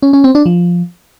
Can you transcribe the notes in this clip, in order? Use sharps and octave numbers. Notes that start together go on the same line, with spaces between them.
C#4
C#4
C4
D4
F3